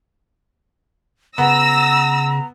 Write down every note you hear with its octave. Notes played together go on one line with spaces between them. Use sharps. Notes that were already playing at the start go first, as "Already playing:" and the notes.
C#3 B3 A#5 E6 A#6